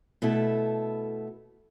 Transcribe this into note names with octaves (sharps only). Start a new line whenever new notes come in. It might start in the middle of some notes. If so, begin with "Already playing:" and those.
B2 A3 E4 A4